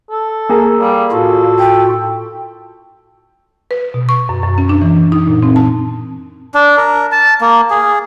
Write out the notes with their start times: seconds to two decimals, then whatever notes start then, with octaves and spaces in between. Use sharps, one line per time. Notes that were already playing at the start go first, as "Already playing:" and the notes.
0.11 A4
0.49 A#3 G#4 A#4
0.80 G3 F5
1.11 A2 F4 F#4 A4
1.59 G5
3.71 B4
3.94 B2
4.09 C#6
4.29 F#2
4.43 F#2
4.58 C#4
4.69 D4
4.82 E3
5.12 D#4
5.27 A#2
5.43 C4
5.56 A5
6.54 D4
6.78 A#4
7.12 A5
7.41 A#3
7.70 G#4